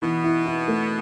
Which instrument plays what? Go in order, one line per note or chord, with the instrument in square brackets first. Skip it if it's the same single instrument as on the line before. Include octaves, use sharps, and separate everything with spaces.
[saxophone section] B2 B3 [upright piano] E3
[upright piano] E4
E4
A3